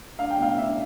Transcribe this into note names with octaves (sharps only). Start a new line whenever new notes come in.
D4 F5
G5
B2 F5
D4 E5